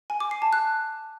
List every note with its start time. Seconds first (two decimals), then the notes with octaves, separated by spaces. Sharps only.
0.10 G#5
0.20 D6
0.31 C7
0.42 A5
0.53 F#6